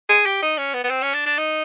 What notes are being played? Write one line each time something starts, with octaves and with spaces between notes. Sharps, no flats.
G#4
G4
D#4
C#4
B3
B3
C4
C#4
D4
D4
D#4